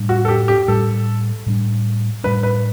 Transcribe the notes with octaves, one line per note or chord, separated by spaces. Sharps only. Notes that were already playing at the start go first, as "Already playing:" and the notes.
Already playing: A2 G3 D4
F#4
A4
G4
G4
A2 G3 D4 A4
A2 G3 D4
A2 G3 D4 B4
B4